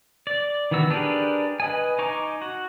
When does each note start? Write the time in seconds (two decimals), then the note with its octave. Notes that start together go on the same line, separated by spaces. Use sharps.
0.27 D5
0.71 D#3 E3 B3 F#4 E6
0.90 D4 G4 G#4 A#4 B4
1.60 B4 D#5 G#5
1.99 D#4 G#5 A#5 C#6 D6
2.42 F#4